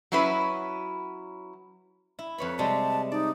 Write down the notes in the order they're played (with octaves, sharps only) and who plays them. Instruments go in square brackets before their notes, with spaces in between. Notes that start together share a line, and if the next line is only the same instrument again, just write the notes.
[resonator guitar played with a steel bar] F#3 C#4 E4 F#4 B4
[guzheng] E4
[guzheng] F2 C#5 B5 [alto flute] B4
[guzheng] C3 G3 G#3 [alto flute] A5
[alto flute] D#4 [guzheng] D5